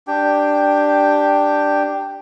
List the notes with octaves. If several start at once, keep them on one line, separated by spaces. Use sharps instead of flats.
D4 G4 G5